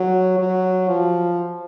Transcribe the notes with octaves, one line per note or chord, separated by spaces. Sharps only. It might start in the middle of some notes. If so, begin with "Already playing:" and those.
Already playing: F#3
F#3
F3